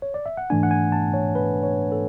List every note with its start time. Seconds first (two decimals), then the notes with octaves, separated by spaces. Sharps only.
0.02 C#5
0.14 D5
0.26 E5
0.37 F#5
0.50 G#2 E3 A3 D4 G#5
0.63 F#5
0.71 G#5
0.92 A5
1.14 C#5
1.35 B4
1.63 C#5
1.92 A4